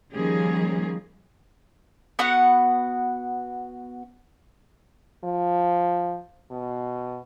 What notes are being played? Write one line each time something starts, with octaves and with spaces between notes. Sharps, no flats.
D#3 F3 G3 A#3 C#4 G#4
B3 F#4 F#5
F3
B2